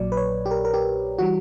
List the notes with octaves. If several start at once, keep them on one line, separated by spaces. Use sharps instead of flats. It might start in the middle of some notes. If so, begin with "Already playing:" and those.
Already playing: A#1 A#2 F#3 D5
B4
C#5
G4
A#4
A#4
G4
E3 G3 F#4